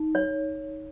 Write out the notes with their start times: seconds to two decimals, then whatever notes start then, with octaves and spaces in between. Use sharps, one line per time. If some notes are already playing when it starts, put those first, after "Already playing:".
Already playing: D#4
0.15 C#5